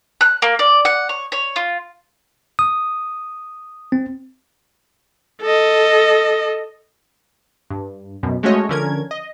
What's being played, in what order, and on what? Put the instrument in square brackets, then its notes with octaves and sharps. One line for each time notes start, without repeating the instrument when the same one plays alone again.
[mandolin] F#6
A#3
D5
F#5
C#5
C#5
F4
[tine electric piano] D#6
C4
[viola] A4 D#5
[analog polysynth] G2
F#2 B2
G#3 A3 C#4 F#4 C#5 D#5
D3 F3 C#4 A#4 G#6
D#5